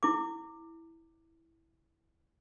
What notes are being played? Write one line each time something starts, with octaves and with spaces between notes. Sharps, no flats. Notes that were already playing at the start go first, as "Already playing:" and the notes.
E4 D6